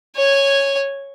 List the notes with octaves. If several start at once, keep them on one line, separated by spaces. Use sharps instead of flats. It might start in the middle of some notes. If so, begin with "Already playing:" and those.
C#5 G#5